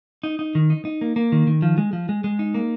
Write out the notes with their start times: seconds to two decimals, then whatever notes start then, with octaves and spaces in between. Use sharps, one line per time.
0.23 D#4
0.39 D#4
0.55 D#3
0.70 D#4
0.85 D#4
1.01 A#3
1.16 A#3
1.32 D#3
1.47 D#3
1.62 F3
1.78 G#3
1.93 F3
2.09 G#3
2.24 G#3
2.39 D#4
2.54 A#3